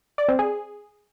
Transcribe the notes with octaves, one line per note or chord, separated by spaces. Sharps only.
D5
C4
G#4